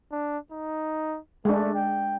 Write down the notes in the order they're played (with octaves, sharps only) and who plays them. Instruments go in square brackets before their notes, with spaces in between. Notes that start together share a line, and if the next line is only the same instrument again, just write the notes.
[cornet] D4
D#4
[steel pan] G#3 D4 [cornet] A3
[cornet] G5